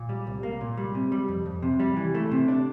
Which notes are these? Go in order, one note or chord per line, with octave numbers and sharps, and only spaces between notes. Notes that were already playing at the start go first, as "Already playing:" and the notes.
Already playing: A#2
G3
C2
A#3
A#2
G3
C3
G3
F2
F2
C3
G3
E3
A3
C3
D4